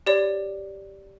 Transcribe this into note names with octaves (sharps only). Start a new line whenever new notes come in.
G4 C#5 D5